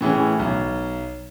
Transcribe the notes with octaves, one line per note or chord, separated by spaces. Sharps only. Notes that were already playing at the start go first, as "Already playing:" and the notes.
A2 E3 C#4 G#4
B1